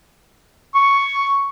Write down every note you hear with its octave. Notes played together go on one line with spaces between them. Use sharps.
C#6